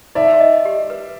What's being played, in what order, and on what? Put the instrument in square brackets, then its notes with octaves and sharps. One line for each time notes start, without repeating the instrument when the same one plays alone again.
[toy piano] D#4 [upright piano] D5 E5
[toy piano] D#5
G4
B4